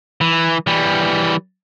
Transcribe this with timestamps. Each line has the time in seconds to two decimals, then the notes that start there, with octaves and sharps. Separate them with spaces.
0.21 E3
0.67 E3 G3